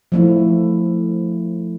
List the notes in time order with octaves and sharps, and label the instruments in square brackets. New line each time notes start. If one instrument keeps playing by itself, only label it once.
[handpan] F3 A3 E4